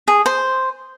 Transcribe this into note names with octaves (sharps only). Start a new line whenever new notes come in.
G#4
C5